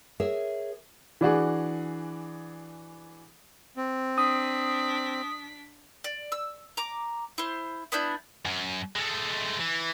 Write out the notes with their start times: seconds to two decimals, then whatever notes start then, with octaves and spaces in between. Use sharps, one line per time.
0.20 G#4 A#4 C#5 E5
1.21 E3 D4 F#4 G#4
3.77 C4
4.18 D4 D#6 B6
6.04 D5
6.32 E6
6.77 A#5 D6
7.38 E4 C5
7.92 B3 D4 E4 G6
8.45 F#2
8.96 G#3 A3
9.60 E3